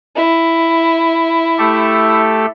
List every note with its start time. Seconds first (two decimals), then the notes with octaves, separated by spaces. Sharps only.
0.16 E4
1.58 A3 G4 A4